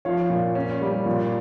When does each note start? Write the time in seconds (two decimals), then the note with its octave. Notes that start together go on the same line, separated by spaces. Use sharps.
0.05 F3 C#5 F5
0.30 A#2
0.55 C#4
0.81 G3
1.06 A#2